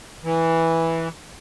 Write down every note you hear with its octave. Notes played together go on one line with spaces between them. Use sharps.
E3